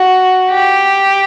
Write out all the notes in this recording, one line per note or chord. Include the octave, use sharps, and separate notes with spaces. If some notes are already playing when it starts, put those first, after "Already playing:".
Already playing: F#4
G4